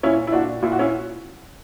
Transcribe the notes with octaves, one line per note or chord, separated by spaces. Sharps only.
A#2 C#4 E4
E4
A#2 D4 F#4
A#2 E4
F#4
C#4 E4